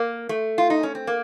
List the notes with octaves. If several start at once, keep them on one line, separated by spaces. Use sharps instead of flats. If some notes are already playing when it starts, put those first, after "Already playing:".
Already playing: A#3
A3
F4
D#4
C#4
C4
A#3